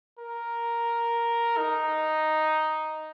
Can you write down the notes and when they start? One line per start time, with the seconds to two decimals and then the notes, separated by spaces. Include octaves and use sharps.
0.19 A#4
1.58 D#4